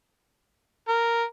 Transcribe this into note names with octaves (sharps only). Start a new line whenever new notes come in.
A#4